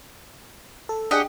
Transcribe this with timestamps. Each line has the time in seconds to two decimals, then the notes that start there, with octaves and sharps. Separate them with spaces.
0.89 A4
1.11 D4 G4 G#4 D#5 F#5